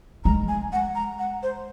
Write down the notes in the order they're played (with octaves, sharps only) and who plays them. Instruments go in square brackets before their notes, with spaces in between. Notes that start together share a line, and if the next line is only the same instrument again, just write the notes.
[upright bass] G#3 [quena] A#5
[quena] G#5
F#5
A#5
F#5
C5